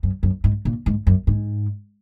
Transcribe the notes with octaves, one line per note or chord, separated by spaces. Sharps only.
F#2
F#2
G#2
A#2
G#2
F#2
G#2